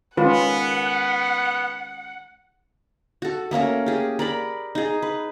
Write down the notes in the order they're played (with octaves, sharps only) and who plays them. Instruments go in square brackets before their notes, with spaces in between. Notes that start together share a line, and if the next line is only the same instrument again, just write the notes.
[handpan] D#3 G#3 C#4 [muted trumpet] B3 [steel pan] F4 B4 [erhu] F#5
[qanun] F#4 A4
A3 A#3 C#4 A#4
G4 G#4
A#4 D5 B5
D#4 G#4
B4